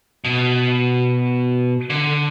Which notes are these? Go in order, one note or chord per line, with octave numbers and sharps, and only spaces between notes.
B2
D3